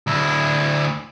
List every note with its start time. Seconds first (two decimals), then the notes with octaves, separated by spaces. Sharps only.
0.07 D2 E4